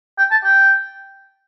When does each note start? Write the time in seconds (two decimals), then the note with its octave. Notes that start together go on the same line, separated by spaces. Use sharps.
0.18 G5
0.31 A5
0.43 G5